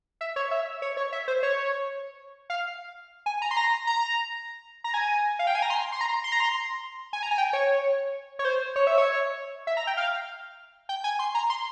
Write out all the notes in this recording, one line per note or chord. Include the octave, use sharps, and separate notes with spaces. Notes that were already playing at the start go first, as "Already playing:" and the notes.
E5
C#5
E5
C#5
C#5
E5
C5
C#5
F5
G#5
A#5
C6
A#5
A#5
A#5
G#5
F5
G5
G#5
A#5
C6
C6
A#5
C6
A#5
C6
G#5
A#5
G#5
G5
C#5
C#5
C5
C#5
E5
C#5
E5
A#5
G5
F5
G5
G#5
C6
A#5
C6